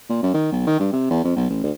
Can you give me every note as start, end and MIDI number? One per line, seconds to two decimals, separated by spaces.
0.09 0.18 46
0.22 0.33 42
0.34 0.47 51
0.52 0.63 35
0.67 0.79 51
0.79 0.88 43
0.92 1.09 48
1.10 1.23 40
1.24 1.31 41
1.36 1.47 35
1.50 1.61 33
1.63 1.71 38